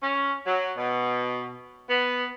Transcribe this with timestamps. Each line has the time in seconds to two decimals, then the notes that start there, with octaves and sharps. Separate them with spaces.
0.03 C#4
0.47 F#3
0.77 B2
1.90 B3